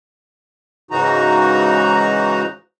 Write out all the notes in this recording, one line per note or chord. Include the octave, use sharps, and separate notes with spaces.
G#2 C#3 E3 D#4 F#4 A#5